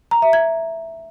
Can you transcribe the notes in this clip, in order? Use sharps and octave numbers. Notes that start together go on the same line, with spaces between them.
A#5
E5
G#6